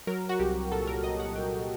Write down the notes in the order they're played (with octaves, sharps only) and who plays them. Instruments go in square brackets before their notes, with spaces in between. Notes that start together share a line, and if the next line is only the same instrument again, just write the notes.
[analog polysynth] F#3 A#4
F#4
C2 G4
A#2 A4
A#4
C2 D#5
F#5
C2 G5